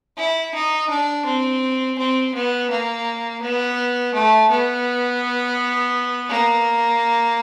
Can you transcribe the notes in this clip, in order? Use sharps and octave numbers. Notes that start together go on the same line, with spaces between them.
E4
D#4
D4
C4
C4
B3
A#3
B3
A3
B3
A#3